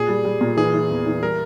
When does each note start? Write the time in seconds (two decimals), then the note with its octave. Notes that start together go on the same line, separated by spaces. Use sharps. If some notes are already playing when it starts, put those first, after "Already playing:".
Already playing: A#2 G#4
0.08 G3
0.25 G3
0.41 A#2
0.57 E3 G#4
0.74 E3
0.90 E2
1.06 E3
1.22 G3 A#4